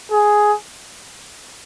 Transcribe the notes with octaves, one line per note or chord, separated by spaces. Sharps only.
G#4